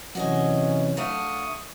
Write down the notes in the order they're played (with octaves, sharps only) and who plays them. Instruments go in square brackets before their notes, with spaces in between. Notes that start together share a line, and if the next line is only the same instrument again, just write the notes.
[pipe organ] C3 E3 C#4 [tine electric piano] F#3 [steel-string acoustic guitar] F#4 D#5 G#5
[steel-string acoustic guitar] D3 A3 F5 [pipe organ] C#6 D#6